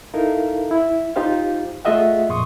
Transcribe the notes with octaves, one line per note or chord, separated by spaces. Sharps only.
D#4 E4 A4 A#4 F5
E4
D#4 F4 G4 C5 F5
A3 F4 G#4 D#5 E5 F#5
F2 A#2 C6 C#6 D#6